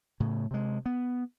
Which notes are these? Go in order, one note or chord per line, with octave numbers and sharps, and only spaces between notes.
A2 C#3
C3 G#3
B3